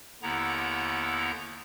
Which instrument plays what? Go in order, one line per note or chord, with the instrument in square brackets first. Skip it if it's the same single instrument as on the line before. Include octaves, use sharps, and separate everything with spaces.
[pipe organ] D#2 D3 B3 E4 A#5